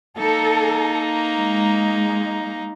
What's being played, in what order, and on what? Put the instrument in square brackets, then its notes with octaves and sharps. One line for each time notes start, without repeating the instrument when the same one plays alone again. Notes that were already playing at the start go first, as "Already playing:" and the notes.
[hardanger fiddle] A#3 D#4 [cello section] A4
[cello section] G#3